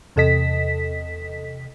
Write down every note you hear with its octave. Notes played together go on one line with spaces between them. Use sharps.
E2 C3 A4 D#5 B6